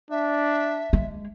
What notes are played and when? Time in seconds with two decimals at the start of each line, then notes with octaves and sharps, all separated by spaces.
0.11 D4 E5
0.93 G#3